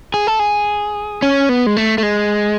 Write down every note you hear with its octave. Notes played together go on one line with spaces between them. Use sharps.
G#4
A4
G#4
C#4
B3
G#3
A3
A3
G#3